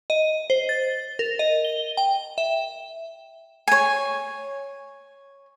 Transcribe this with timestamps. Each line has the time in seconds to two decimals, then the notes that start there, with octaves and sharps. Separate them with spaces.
0.10 D#5
0.50 C5
0.69 A6
1.19 A#4
1.39 D#5
1.65 G7
1.97 G5
2.38 E5
3.68 C#5 G#5